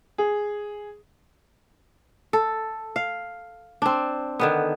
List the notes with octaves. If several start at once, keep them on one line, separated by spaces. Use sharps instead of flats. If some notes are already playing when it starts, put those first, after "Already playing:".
G#4
A4
F5
C4 D4
D3 D#3 B3